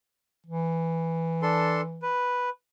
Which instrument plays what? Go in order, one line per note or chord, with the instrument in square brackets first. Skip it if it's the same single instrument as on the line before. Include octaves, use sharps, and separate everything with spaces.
[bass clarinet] E3
[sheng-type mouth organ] D4 A4 C6
B4